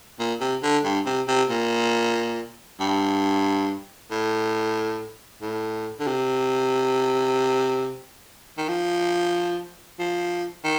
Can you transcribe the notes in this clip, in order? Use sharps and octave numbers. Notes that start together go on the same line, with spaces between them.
A#2
C3
D3
G2
C3
C3
A#2
G2
A2
A2
D3
C3
D#3
F3
F3
D#3